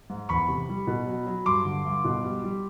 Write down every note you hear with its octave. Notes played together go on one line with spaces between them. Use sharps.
G#2
E2 B5 C#6
C3
G3
B2
F#3
F#3
G2 C6 D6
D3
G2
B2
G3
G3